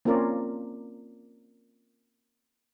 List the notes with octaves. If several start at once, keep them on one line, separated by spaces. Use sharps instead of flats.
A#3 C4 C#4 F4 A#4 D5